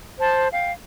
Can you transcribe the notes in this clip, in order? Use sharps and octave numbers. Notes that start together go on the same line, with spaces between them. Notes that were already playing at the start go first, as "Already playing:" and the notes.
C5 A5
F5 G5